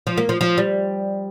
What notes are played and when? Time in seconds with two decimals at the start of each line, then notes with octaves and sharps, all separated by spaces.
0.07 F3
0.17 A#3
0.29 F3
0.41 F3
0.58 G3